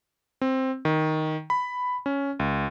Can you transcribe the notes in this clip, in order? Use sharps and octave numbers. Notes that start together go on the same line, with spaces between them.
C4
D#3
B5
C#4
C#2